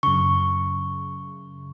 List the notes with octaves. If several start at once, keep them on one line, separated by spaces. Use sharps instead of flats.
F#2 C#3 C#6